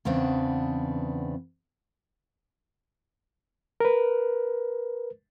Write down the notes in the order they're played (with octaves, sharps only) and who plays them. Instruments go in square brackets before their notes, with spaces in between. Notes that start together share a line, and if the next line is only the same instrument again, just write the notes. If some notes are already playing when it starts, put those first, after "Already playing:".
[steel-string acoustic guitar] E2 C#3 B3 C4 D4
[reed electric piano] A#4 B4